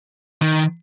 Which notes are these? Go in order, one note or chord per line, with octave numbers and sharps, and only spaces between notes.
D#3